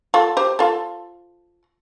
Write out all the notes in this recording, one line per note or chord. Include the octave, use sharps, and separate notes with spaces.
F4 A4
G4 C5
F4 A4